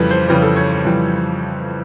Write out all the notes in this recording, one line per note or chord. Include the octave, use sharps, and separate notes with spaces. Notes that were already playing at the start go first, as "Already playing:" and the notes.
Already playing: F2 C#3 E3 G3 A4 B4
C5
F2 C#3 E3 G3 B4
A4
C#5
C#5
F2 C#3 E3 G3